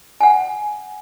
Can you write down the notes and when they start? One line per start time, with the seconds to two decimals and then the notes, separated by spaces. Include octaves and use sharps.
0.20 F#5 G#5